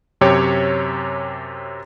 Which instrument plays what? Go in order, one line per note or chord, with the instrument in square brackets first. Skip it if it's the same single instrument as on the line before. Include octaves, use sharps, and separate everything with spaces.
[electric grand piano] F#2 C3 G4 C#5